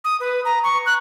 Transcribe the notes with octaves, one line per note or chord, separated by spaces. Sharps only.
D#6
B4
A#5
C#6
F#6